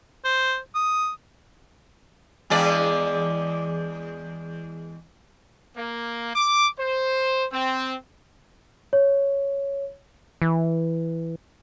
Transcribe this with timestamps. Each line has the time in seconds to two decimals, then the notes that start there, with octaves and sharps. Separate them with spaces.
0.25 C5
0.75 D#6
2.50 E2 G#3 D5
5.77 A#3
6.36 D6
6.79 C5
7.52 C4
8.93 C#5
10.42 E3